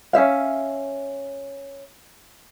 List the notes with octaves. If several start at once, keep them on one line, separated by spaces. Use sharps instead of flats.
C#4 D#4 E5 F5